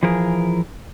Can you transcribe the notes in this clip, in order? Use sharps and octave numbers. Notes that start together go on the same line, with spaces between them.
E3 F3 G#4 A#4